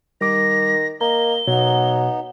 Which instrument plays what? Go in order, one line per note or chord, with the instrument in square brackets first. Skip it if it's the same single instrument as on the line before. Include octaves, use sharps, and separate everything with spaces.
[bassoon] D#3 [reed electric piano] G3 D6 [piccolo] A#6
[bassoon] A#3 [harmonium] D#5 [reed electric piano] A#5 [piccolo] G7
[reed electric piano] B2 [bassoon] F#3 [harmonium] B3 D#4